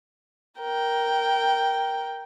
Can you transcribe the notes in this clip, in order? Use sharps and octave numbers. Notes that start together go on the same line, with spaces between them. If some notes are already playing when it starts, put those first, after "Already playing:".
A#4 G5